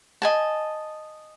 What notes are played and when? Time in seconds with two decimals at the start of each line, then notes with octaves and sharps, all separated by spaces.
0.22 D#5 G#5 A5